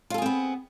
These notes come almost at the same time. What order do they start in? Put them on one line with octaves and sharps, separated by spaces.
F4 A4 G#4 C4 B3